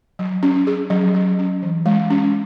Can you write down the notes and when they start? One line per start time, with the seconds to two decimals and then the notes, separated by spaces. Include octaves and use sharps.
0.19 F#3
0.43 C#4
0.67 G#4
0.90 F#3
1.14 F#3
1.39 C#4
1.62 E3
1.86 G#3
2.10 C#4